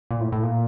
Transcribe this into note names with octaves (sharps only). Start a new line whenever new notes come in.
A#2
A2
A2
A#2